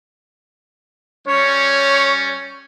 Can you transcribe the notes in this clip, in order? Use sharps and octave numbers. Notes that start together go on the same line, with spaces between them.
G3 C#4 C#5